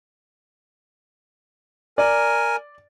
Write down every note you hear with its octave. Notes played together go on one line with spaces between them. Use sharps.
A#4 D5 G#5